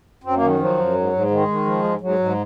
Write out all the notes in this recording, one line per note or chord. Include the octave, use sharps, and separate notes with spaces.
F#2 C4
A#3
D#3
F#3
F3 F#3
F#2
G#2
G#2
D#3 G#3
D#3
F3
G#2
G#2 F#3
G#2